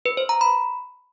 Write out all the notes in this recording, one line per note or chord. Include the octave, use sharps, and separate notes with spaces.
B4
C5
A#5
B5